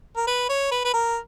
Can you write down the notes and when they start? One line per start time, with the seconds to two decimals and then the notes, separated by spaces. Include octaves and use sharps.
0.16 A#4
0.27 B4
0.49 C#5
0.71 B4
0.84 B4
0.93 A#4